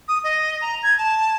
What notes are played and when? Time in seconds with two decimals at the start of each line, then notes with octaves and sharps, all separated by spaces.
0.08 D#6
0.24 D#5
0.61 A#5
0.83 G#6
0.98 A5